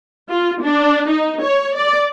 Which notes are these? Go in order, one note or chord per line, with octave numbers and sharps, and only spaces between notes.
F4
D4
D#4
C#5
D5